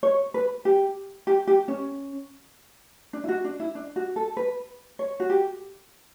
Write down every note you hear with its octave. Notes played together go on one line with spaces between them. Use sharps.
C#5
B4
G4
G4
G4
C#4
D4
E4
F#4
D4
E4
D4
F#4
A4
B4
C#5
F#4
G4